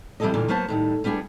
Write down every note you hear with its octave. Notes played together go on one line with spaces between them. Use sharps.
E3 G3 C4 E4 A4 D#5
F2 A#2 D3 E3 A#4
F#3 A#3 B3 C5 A5
A2 D#3 G3
G3 B3 D4 G4 G#4